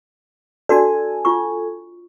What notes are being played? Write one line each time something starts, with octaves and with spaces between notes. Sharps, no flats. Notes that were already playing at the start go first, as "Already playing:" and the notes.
D4 F#4 A4 D5 G#5
F4 C#6